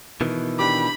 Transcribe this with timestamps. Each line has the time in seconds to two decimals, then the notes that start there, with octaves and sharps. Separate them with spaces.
0.21 B2 D#3 E3
0.59 D4 G4 B5 D6